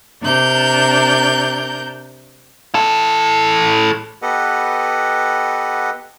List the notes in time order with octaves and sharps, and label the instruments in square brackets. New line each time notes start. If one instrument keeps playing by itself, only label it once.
[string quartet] C3 D4 A#4 G6
[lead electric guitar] E3 A4
[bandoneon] B3 G4 A4 B4 D#5 F#5